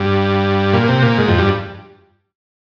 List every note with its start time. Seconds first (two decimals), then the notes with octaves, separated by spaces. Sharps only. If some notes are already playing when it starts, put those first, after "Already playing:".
Already playing: G2
0.73 A#2
0.88 C3
1.03 A#2
1.18 G#2
1.28 F2
1.39 G2